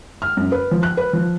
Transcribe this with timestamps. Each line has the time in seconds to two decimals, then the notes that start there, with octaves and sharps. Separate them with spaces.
0.22 F6
0.37 F#2
0.52 B4
0.71 F3
0.83 F#6
0.97 B4
1.13 F3